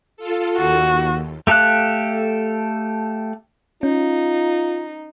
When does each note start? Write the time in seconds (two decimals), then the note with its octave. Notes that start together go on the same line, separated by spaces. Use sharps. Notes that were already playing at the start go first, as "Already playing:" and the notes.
0.17 F4 A4
0.57 D#2 F#4
1.47 A3 G4 A4 F5 F#6
3.83 C#4 D#4 F4